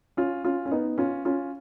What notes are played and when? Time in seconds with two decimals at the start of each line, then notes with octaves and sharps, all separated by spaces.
0.17 C#4 F4
0.44 C#4 F4
0.66 C#4
0.71 B3 D#4
0.98 C#4 F4
1.25 C#4 F4